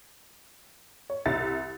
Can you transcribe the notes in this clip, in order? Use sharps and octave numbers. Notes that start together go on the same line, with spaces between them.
C#5
C2 E5 A6